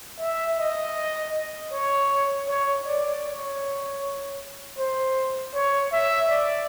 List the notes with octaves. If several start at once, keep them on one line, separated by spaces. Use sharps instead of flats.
E5
D#5
C#5
C#5
D5
C#5
C5
C#5
E5
D5